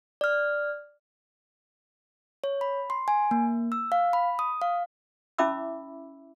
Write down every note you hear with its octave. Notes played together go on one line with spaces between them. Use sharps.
D5 F6
C#5
B5
C6
G#5
A#3
E6
F5
B5
D#6
F5
C#4 E4 E5 B5 D6 E6